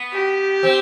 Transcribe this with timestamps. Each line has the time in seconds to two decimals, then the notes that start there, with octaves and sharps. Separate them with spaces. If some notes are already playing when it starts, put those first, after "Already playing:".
Already playing: B3
0.13 G4
0.63 C4